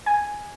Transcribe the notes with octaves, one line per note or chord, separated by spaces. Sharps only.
G#5